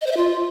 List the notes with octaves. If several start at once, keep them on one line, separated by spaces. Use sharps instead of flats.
D#5
C5
E5
F4